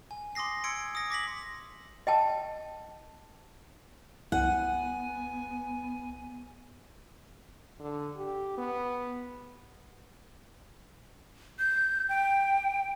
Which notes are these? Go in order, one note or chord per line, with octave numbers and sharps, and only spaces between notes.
G#5
C6 D6 D#6 A#6 C7
C6 E6 G#6 C#7 D7
D#6 A#6
D6 A#6 B6 F#7
D#5 G5 A5
C2 B3 F#5 G#5
D3
G4
B3
G6
G5